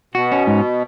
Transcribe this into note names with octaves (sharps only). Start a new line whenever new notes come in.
B2 F#4
C#4
G#2